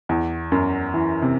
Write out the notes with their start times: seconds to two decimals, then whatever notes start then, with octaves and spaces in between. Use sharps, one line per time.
0.09 E2
0.52 F#2
0.94 E3
1.22 C3